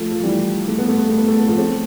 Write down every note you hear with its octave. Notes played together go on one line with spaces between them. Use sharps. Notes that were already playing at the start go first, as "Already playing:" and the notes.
Already playing: F3 A3
F3
E3 G3
A3
B3
A3
B3
A3
B3
A3
B3
F3 A3
A3 C4